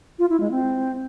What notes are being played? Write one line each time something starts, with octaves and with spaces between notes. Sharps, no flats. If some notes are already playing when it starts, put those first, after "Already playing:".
F4
E4
G#3
C4